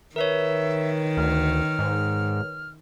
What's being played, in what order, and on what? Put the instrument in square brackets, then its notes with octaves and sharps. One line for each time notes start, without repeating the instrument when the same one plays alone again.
[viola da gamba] D#3 [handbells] A#4 B4 C#5 [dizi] E5
[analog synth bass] D2 [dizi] F6
[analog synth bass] G#2